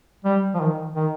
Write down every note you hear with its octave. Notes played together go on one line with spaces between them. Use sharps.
G3
F3
D#3
D#3